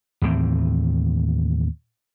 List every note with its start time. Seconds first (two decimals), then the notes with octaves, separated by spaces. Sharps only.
0.22 D#2 A2 E3 C4